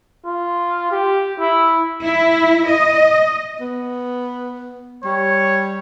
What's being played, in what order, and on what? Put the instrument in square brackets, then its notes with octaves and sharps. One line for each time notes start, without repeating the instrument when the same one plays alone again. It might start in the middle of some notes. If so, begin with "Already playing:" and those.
[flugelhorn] F4
G4
E4
[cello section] E4
D#5
[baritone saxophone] B3
[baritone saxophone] G3 [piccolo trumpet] C#5